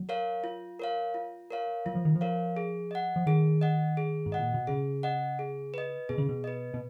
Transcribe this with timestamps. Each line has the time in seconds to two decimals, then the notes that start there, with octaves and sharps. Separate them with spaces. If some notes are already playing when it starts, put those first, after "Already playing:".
Already playing: F#3
0.09 A#4 C#5 F5
0.44 F4
0.79 A#4 C#5 F5
1.14 F4
1.50 A#4 C#5 F5
1.86 F#3 F4
1.95 F3
2.05 D#3
2.15 F3
2.21 A#4 C#5 F5
2.57 G#4
2.91 D#5 F#5
3.16 F3
3.26 D#3 G#4
3.61 D#5 F#5
3.97 G#4
4.26 G#2
4.32 D#5 F#5
4.40 A#2
4.54 B2
4.67 C#3 G#4
5.03 D#5 F#5
5.39 G#4
5.74 B4 D#5
6.09 B2 G#4
6.18 C#3
6.29 B2
6.44 B4 D#5
6.74 B2